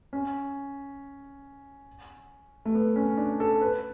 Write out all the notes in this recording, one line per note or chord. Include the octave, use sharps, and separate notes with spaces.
C#4
A3
B3
C#4
D4
A4
B4